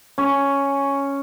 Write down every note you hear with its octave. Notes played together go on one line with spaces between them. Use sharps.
C#4